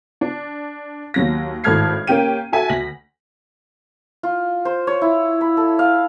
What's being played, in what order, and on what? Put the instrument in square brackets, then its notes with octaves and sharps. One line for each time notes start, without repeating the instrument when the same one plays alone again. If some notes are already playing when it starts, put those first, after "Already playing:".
[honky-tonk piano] D4
D#2 F#3 A#6
G#1 A2 A4 F6 G#6 C7
A#3 C#4 G4 G5 D#7
F#4 A4 E5 G#5
D2 A#6 B6 F#7
[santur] F4
C5
C#5
E4
B5
A4
F5